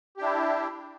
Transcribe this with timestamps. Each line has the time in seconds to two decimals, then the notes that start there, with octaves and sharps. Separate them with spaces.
0.17 G4
0.20 D4
0.23 E4